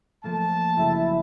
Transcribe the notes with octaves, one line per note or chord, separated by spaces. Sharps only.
F3 A3 A#3 A5
F#1 E4